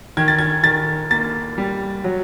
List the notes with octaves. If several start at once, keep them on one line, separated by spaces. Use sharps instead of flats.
D#3 G#6
A6
G#6
D#3 A6
A#3 A6
G3
F#3